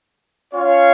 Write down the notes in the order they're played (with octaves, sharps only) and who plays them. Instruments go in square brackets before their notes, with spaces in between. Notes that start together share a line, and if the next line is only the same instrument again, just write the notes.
[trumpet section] C#4 F4 C#5 F5